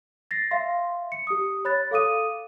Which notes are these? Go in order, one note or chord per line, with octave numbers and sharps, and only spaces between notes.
A6 A#6 C7
E5 F5 C6
C#7
G4 D#6
C#5 B5 F#6 A6
A4 F5 D6 D#6 D#7